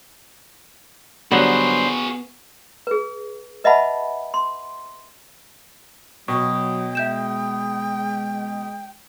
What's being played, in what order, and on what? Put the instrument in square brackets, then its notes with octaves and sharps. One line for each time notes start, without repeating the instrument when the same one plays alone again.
[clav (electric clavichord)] G2 D3 F#3 [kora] B3 [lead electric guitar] F#4 G#4 [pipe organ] C5
[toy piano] G#4 B4
B4 D#5 E5 F#5 A5 B5
C6
[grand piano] B2 [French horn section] F#3 [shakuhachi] G5 [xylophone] C#6
[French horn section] G#3 [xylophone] E5 G6 E7